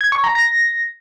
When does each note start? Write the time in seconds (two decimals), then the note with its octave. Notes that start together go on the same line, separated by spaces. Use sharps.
0.01 G#6
0.12 C#6
0.24 A#5
0.35 A#6